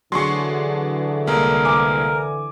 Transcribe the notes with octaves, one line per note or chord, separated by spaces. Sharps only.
D3 E3 F#3 D4 G#4 C6 C#6
C2 G#3 A#3 A#4
G#5 D6